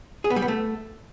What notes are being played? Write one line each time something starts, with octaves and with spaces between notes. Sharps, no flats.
G#4
B3
G3
B3
A3